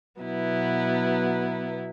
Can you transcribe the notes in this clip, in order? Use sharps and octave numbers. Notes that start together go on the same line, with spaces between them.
B2 F#3 B3 E4